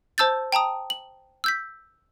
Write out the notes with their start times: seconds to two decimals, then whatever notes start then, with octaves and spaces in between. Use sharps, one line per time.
0.18 C5 A5 E6 G6 A6
0.52 G5 A5 A#5 D#6
0.90 F#7
1.44 E6 G6 B6